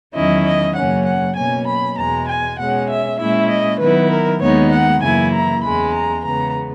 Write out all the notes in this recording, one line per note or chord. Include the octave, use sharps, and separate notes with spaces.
E2 D#3 F#3 C#4 E4 D#5
D#5
F#2 C#3 F#3 A#3 C#4 F#5
F#5
B2 F#3 A#3 C#4 G#5
B5
E2 B2 G#3 A#5
G#5
B2 G#3 C#4 F#5
E5
A#2 G#3 C#4 E4 E5
D#5
D#3 F#3 B3 E4 B4
A#4
D#2 D#3 G#3 B3 D#4 C#5
F#5
F#2 C#3 E3 A#3 E4 G#5
A#5
E2 C#3 G#3 B5
A#5
E2 C#3 G#3 B3 A#5